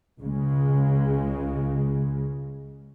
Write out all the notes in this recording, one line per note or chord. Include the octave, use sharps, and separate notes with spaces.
C#2 C#3 G#3